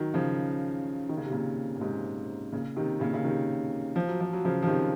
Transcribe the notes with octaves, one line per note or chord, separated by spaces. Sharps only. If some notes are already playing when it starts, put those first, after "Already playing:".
Already playing: D#3 F#3
C#3 F3
D#3
C#3
C3
A#2 C#3
A#2
G#2 C3
A#2 C#3
C3 D#3
A#2 C#3
C#3
C3 D#3
F3
F#3
F3
F#3
C#3 F3
F3
C3 D#3